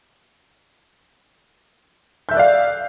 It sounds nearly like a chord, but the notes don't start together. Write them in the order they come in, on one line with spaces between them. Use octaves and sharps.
G6 E5 F#6 D5 F5